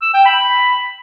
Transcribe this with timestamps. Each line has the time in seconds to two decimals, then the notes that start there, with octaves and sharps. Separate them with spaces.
0.02 E6
0.14 G5
0.26 B5